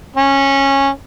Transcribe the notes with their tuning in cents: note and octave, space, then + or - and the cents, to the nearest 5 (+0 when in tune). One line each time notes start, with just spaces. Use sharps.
C#4 -15